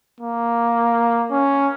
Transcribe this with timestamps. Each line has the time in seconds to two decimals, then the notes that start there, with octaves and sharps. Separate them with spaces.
0.21 A#3
1.31 C#4